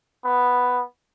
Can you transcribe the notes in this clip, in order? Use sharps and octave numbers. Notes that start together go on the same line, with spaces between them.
B3